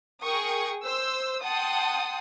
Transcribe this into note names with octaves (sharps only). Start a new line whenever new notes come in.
G#4 A#4 G5 C#6 D#6
C5 E6
F#5 G5 A5 C6 D#6